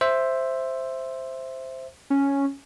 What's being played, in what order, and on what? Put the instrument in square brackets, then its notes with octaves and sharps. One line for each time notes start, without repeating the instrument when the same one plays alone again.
[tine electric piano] C5 E5
[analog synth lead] C#4